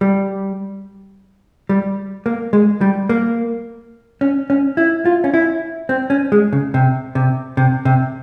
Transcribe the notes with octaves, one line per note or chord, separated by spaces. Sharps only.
G3
G3
A#3
G#3
G3
A#3
C#4
C#4
E4
F4
C#4
E4
C4
C#4
G#3
C#3
C3
C3
C3
C3